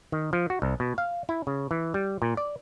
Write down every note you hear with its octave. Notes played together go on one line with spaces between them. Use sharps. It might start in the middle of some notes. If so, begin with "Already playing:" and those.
D#3
F3
F#4
C2
B2
F5
E4
C#3
E3
G3
A#2
D5